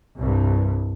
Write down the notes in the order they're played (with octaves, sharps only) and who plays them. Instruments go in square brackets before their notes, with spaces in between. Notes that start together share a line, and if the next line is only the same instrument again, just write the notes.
[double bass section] C2 G2